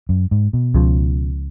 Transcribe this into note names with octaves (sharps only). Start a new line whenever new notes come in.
F#2
G#2
B2
C#2 C#3 F3